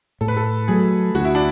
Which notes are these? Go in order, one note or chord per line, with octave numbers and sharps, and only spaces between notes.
A2 A4
B4
A4
F#3 A3 G#4
D2 F#4
E4
D4